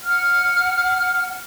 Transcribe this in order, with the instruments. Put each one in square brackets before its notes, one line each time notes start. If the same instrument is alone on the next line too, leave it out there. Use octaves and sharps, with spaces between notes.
[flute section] F#5 F6